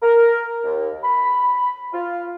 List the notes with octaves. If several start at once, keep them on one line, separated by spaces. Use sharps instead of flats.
A#4
D#2
B5
F4